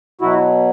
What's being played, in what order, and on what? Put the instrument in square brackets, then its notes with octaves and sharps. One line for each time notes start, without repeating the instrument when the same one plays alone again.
[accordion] B2 F#3 E4 F#4